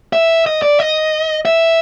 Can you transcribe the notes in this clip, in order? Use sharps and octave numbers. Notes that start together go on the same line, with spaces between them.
E5
D#5
D5
D#5
E5